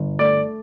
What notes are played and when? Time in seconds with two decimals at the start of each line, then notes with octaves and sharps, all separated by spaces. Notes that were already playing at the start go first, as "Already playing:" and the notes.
Already playing: G1
0.19 A3 D5